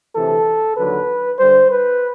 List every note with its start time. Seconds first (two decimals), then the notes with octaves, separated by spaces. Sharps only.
0.14 D2 C3 E3 A4
0.76 D#2 D3 F#3 B4
1.39 G2 D3 G3 C5
1.70 B4